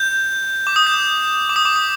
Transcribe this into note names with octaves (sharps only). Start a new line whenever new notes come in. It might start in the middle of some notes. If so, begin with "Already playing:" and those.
Already playing: G6
D6
D#6
G6
D6
D#6
D6
D#6